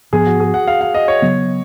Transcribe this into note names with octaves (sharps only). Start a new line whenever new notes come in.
G#2 F3 B3 G#4
F#4
G#4
F#5
F5
F5
D#5
C#5
C#3 F#3 B3